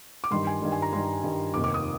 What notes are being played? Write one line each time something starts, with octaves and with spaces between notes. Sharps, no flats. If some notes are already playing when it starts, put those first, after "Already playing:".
D6
G2 D#3 G3 C6
G#5
G2 D#3 G3
G#5
A#5
G2 D#3 G3 C6
G2 D#3 G3
F1 D#2 D#3 A#3 D6
D6
D#6